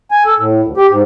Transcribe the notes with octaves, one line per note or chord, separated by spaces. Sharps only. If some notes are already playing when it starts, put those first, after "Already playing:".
G#5
A4
A2
D2
G4
G#2